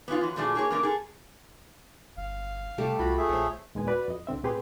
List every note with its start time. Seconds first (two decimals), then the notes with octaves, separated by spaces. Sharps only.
0.08 B3 C#4 E4 F4
0.21 E3 F#3
0.36 A#2 F3 A3 D4 F#4 G#4
0.55 A#3 G#4 C#5
0.70 F#2 C#3 A#3 D4 A#4
0.83 G#4 A4 A#5
2.17 G1 F5
2.78 C3 G3 A3 G4
2.99 C2 F4 F#4 B5
3.18 A3 G#4 E5
3.29 A#1 C5 C#5
3.75 D#2 A#2 G#3 B3 B4 G#5
3.87 F#4 B4 D5
4.08 F2 D#5
4.27 C2 D3 C4 E5
4.44 A2 C4 G4 G#4 B4 C6